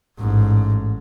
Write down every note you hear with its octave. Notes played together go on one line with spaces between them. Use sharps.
A1 G#2